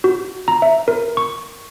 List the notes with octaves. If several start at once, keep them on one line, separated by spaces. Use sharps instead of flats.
F#4
A#5
E5
A#4
C#6